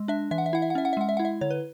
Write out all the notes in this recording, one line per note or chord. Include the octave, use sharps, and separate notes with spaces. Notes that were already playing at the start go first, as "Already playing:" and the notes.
Already playing: G#3
D4 E5
E3 E5
F#5
E5
E4 F#5
E5
F#5
C#4 E5
F#5
E5
G#3 F#5
E5
E4 F#5
E5
D3 C#5
B4